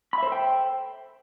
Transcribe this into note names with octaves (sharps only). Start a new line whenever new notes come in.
A4 C5 E5 G5 B5